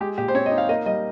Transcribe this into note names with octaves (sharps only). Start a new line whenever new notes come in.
G#3 G4
A#2 G4
C5
C4 C#5
D#5
D#4
F5
A#3 D#5
G3 D#5